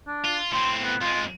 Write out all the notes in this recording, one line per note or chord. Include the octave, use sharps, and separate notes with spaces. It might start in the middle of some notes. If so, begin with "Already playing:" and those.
D4
F4
A2 C4 C6
B3
F2 G#3 F4